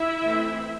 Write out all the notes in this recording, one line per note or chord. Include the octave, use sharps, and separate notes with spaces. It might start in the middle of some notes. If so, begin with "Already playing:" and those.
Already playing: E4 E5
E3 A3 C4